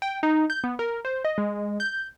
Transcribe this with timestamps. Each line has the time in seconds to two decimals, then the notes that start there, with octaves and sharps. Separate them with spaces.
0.02 G5
0.23 D#4
0.50 G6
0.64 B3
0.79 A#4
1.05 C5
1.25 D#5
1.38 G#3
1.80 G6